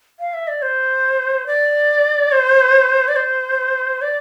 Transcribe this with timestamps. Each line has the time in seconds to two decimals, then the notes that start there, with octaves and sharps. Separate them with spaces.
0.20 F5
0.34 E5
0.48 D5
0.62 C5
1.47 D5
2.32 C5
3.08 D5
3.16 C5
4.02 D5